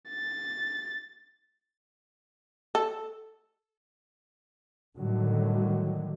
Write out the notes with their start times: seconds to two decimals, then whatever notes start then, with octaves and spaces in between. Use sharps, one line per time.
0.10 A6
2.75 A4
4.98 A2 D3 D#3 F#3 G3